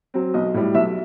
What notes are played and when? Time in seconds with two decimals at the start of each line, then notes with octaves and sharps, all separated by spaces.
0.14 F#3 C4
0.34 B1 D#5
0.54 A2 G3
0.75 B1 E5